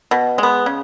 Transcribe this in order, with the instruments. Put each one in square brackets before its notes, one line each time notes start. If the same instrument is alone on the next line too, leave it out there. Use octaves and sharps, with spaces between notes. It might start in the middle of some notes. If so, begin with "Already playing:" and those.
[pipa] B2
G#3 B3
C#3